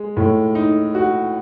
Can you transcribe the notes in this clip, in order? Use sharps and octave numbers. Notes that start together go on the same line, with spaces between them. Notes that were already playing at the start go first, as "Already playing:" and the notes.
Already playing: G#3
A2
D#4
F#4